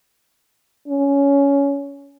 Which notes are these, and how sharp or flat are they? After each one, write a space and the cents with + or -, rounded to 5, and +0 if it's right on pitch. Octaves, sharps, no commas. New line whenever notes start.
C#4 +15